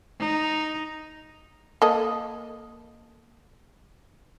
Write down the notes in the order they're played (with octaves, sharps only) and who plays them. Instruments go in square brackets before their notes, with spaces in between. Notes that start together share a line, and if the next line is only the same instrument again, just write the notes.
[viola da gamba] D#4
[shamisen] A#3 A4 D#5